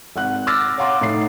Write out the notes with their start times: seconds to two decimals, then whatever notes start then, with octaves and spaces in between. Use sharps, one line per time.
0.16 G#1 F#5 F#6
0.47 D6 E6 F6 A6 A#6
0.78 C#5 F5 F#5 A#5 C6 D6
1.01 A2 D#4 C7